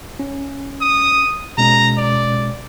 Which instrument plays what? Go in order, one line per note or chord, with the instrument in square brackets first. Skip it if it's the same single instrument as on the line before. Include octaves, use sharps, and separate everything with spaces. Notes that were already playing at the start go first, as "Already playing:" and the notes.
[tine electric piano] C#4
[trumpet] D#6
[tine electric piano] B2 G#3 C#4 [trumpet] A#5
[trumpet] D5